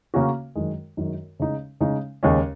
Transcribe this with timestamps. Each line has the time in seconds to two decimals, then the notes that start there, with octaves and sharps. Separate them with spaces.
0.14 C#3 A#3 C#4 F#4
0.55 F#2 D#3 G#3
0.97 F#2 D#3 G#3
1.40 C#3 G#3 D#4
1.80 C#3 G#3 D#4
2.23 D#2 C#3 G#3 C#4